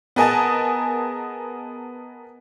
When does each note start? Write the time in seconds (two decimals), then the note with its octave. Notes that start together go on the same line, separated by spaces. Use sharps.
0.16 B3 G#4 A#4 D#5 G#5 A5